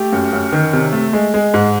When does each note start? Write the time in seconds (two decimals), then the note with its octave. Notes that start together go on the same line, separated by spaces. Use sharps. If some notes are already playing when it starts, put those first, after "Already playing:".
Already playing: A3 G4
0.12 F#2
0.33 F#2
0.52 D#3
0.73 C3
0.93 A3
1.13 G#3
1.34 G#3
1.54 G#2